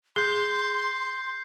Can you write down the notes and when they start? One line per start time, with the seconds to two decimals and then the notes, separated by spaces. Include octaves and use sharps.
0.16 G#4 C6 G6 C7